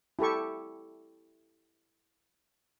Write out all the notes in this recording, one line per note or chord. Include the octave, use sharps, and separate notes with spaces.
E4 G4 A4 C#6